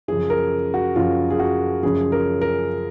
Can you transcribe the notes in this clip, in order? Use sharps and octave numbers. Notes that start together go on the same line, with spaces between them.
F#2 C#3 F3 G#4
A#4
F#4
F#2 C#3 F3 F4
G#4
F#4
F#2 C#3 F3 G#4
A#4
A#4